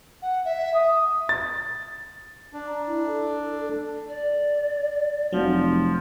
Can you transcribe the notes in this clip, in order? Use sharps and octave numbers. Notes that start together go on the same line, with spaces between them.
F#5
E5
D#6
A6
D4
A#5
E4
A4
D5
F1 F3 F#3